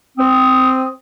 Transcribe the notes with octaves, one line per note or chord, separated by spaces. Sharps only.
C4 D#6